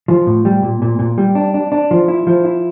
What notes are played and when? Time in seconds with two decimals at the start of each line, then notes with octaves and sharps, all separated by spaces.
0.08 F3
0.27 A2
0.45 G3
0.62 A#2
0.82 A#2
0.99 A#2
1.18 G3
1.35 D4
1.54 D4
1.72 D4
1.91 F3
2.08 E4
2.27 F3
2.45 E4